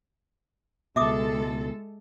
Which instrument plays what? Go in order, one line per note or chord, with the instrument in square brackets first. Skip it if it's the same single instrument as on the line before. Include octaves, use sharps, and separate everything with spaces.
[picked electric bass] C#2 B2 [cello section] G#3 A4 [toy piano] E5 D6 D#6